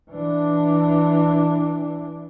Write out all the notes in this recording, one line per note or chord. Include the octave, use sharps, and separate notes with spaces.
E3 D4